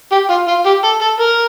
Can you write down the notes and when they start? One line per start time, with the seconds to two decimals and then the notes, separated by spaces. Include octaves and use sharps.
0.12 G4
0.30 F4
0.48 F4
0.66 G4
0.84 A4
1.01 A4
1.20 A#4